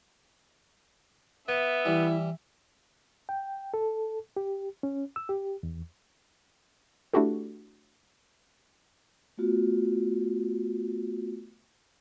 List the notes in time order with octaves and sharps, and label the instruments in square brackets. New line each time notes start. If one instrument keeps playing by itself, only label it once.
[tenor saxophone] B3 [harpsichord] B4 [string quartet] E5
[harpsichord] E3 G3 [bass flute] E4
[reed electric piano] G5
A4
G4
C#4
E6
G4
E2
[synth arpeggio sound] A3 D4 E4 F#4 G4 A4
[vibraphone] A3 B3 F4 F#4